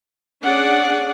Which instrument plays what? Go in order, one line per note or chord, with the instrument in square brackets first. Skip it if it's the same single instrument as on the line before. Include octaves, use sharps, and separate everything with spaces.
[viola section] C#4 D4 G#4 D5 F#5